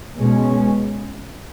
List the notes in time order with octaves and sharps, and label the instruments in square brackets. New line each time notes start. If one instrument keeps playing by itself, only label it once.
[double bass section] B2 G#3 C#4